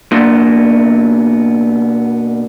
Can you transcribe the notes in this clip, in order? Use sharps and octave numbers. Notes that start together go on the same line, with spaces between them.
B2 A#3 B3 D4 C6